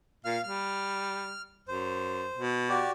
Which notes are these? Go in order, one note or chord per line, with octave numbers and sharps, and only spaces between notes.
A#2 F5 F6
G3 F6
F#2 C5
B2
F#4 G4 D5